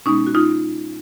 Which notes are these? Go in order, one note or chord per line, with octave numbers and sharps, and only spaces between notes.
B2 G#3 B3 C#4 D#4
F#4
D#4 F4